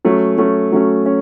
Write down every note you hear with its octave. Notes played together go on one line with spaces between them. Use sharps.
F#3 A3 C#4
F#3 A3 C#4
F#3 A3 C#4
C#4